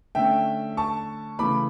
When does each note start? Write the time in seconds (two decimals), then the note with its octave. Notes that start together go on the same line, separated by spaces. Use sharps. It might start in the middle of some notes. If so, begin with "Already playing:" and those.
0.15 D3 A3 C#4 E5 G5
0.77 A5 C#6
1.39 C#3 E3 A3 B5 D6